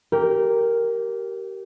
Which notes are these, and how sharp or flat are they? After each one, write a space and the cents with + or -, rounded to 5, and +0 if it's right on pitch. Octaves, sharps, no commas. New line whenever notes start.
G4 -20 A#4 +0 G5 +15